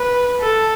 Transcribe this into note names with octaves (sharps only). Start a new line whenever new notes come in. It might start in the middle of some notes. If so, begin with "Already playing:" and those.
Already playing: B4
A4